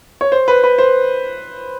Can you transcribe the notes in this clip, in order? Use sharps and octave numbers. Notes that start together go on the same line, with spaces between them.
C#5
C5
B4
B4
C5